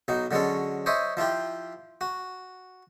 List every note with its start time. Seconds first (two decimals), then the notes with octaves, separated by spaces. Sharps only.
0.08 B1 F#3 D#4
0.31 D3 F#3 G#3 C#4 A4
0.86 C5 C#5 D#5 E5 G#5
1.17 F3 E4 F4 G4
2.01 F#4